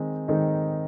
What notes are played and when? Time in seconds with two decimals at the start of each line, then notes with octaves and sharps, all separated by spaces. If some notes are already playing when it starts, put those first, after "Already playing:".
Already playing: D#3 G#3 C4 D#4
0.28 D#3 G#3 C4 D#4